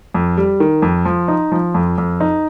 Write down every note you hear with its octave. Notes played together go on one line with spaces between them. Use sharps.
F2
G3
D#3
F2
F3
D#4
F3
F2
F2
D#4